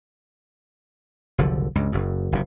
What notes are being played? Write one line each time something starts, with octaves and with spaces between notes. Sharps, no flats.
F#1 C2 D3 F3
C#2 G2
F#1 F#2
F#1 F2 C3